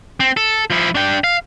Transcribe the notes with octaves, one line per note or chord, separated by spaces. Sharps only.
C4
A4
F3 E4
D4 G5
F5